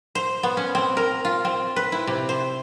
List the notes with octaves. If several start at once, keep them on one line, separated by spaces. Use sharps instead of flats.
C5
B3
C#4
C4
A#4
F4
C4
B4
E4
C3
C5